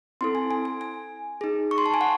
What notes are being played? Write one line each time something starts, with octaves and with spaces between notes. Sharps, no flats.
C4 E4 A4 C6
G#5
G#5
G#5
G#5
D#4 G#4
C#6
C6
A5
G#5
F#5